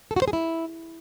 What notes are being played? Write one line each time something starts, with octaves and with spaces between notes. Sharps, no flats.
A4
F#4
C5
G#4
E4